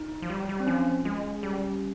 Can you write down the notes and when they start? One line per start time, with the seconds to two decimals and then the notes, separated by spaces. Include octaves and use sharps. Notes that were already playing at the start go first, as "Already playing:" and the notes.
Already playing: D#4
0.22 F3
0.30 G3
0.49 G3
0.60 C4
0.67 F3 C#4
1.05 G#3
1.43 G3